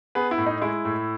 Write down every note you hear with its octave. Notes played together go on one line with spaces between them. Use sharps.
B3 G#4 B4
E4
A2
D#4
G#3 E4
A2